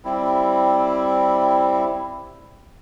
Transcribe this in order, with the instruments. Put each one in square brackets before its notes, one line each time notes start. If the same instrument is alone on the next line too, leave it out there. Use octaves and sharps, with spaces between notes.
[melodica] G3 C4 E4